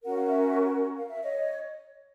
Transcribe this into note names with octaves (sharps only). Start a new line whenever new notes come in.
C#4 F#4 A#4 F#5
F5
E5 F#5
F5
E5
C#5 D#5